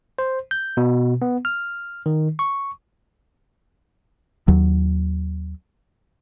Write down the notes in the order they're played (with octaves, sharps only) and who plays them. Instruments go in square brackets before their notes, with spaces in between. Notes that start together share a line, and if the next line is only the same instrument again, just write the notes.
[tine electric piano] C5
G6
B2
B3
F6
D#3
C#6
[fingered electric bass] D#2 F#3